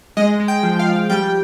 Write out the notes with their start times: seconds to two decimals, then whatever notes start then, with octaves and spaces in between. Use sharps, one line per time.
0.17 G#3 D#5
0.40 G#3
0.48 G5
0.63 F3
0.79 F5
0.86 F3
1.10 G3 G5